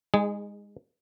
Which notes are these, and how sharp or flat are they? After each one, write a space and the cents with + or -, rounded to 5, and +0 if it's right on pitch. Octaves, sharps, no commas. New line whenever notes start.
G#3 -25 D#4 +5 G#4 +0